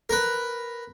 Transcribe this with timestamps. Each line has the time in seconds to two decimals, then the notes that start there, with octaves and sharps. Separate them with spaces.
0.09 A#4 B4